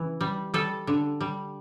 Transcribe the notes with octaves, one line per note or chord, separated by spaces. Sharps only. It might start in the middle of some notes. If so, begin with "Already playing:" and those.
Already playing: C#3 E3
G3
G3 A4
D3
G3